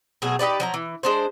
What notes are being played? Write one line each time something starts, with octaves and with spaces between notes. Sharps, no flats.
B2 F#3 A3 G#4
D#4 G4 B4 D5
F3 F#3 A#5
E3
G#3 D4 C5